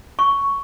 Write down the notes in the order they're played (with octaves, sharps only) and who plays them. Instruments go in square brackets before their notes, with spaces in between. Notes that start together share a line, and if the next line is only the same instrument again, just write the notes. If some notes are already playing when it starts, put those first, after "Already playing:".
[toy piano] C#6